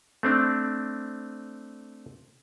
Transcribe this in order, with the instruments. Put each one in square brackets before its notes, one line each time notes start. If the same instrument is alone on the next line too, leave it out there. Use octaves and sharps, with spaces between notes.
[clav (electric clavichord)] A3 C4 D4